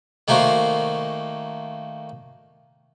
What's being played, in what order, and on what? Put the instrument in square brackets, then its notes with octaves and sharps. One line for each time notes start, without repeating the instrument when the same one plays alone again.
[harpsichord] D#3 A3 A#3 F#4 C5